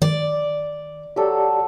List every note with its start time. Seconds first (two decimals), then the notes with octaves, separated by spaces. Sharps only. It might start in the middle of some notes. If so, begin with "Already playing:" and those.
0.02 D#3 D5
1.16 F#3 G4 A4 D5